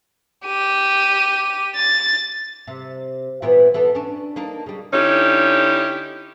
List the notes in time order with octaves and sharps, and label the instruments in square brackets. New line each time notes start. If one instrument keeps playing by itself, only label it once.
[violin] G4 D#7
A6
[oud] C3
A#2 E3 B3
E3 B3 A4
C#4 D4
A#3 D4 D#4
C#3 G3
[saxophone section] D3 C#4 D#4 E4 G4